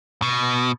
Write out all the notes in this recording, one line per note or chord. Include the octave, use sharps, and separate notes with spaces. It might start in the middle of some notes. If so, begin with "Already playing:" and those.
B2